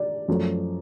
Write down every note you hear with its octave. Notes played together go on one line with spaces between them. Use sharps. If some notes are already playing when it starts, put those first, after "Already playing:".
Already playing: D5
F#2 F3 A3